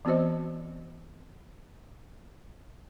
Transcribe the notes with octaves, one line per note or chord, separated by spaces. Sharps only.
E3 B3 C4 F#4 C5 D#5